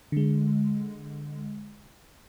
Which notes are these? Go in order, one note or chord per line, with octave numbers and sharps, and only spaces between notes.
D3 G#3